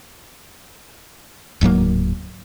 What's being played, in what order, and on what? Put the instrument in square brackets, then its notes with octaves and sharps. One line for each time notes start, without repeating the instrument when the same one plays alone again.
[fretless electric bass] D1 G#2 F#3 A#3